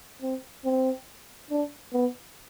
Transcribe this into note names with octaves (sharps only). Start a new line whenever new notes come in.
C4
C4
D4
B3